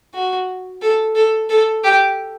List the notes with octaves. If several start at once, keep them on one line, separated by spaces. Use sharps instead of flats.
F#4
A4
A4
A4
G4